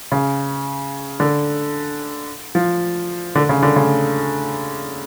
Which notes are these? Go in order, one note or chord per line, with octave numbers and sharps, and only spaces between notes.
C#3
D3
F3
D3
C#3
D3
C#3